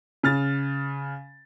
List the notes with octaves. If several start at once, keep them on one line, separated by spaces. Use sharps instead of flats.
C#3 F6 A6